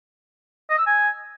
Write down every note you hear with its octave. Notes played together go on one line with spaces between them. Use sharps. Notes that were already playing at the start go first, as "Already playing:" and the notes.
D#5
E6
G#5